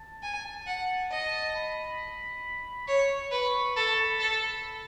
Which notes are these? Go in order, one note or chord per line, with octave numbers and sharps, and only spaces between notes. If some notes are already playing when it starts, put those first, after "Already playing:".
Already playing: A5
G#5
F#5
D#5 A5
B5
C#5 C#6
B4
A4 B5
A4